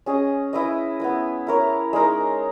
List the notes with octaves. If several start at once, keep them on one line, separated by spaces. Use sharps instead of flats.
C#4 G#4 D#5
E4 B4 D#5
B3 E4 B4
E4 A#4 C#5
G#3 D#4 A#4